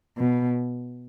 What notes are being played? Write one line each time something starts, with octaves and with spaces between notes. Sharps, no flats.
B2